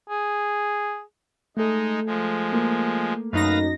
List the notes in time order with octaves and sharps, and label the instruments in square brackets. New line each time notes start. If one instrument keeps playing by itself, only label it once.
[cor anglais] G#4
[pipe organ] G#3 D#4 [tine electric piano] A3 A4
[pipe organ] F3 G#3
[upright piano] A#3
[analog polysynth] F#2 D#4 A#6 [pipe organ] B4 F5